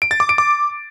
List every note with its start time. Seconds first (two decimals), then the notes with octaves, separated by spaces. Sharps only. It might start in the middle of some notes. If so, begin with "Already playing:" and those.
0.02 D7
0.11 A6
0.20 D6
0.29 D7
0.38 D6